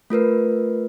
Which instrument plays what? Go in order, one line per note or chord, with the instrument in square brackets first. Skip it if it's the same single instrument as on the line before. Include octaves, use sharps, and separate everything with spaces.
[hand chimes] A3 F4 A#4 B4